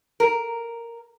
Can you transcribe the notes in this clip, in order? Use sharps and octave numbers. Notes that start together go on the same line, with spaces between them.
A#4